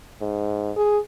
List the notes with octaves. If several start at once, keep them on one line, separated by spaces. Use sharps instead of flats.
G#2
G#4